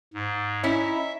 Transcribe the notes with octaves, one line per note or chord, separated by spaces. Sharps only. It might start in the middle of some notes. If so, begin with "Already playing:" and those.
G#2
C#4 D#4 E4 E5